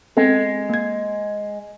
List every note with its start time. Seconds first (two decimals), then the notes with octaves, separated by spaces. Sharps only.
0.17 G#3 B3 C4 A4
0.69 A#3 G#6